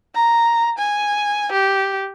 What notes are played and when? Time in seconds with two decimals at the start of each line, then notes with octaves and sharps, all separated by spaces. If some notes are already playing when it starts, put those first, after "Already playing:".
0.15 A#5
0.78 G#5
1.52 G4